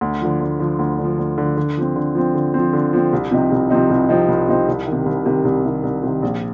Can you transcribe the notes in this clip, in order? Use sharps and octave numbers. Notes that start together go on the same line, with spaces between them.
D2
D3 F3
D2
D3 F3
D2
D3
F3
D2
D3 F3
D3
F3 C4
D3
F3 C4
D3
F3 C4
D3
F3 C4
C2
C3 F3 C4 D#4
C2
C3 F3 C4 D#4
C2
C3 F3 C4 D#4
C2
C3 F3 C4 D#4
C2
D#3
C3
C2
C3 D#3
C2
C3 D#3
C2
C3 D#3
A#1